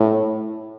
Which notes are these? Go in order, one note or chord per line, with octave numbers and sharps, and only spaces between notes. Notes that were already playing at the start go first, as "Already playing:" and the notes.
Already playing: A2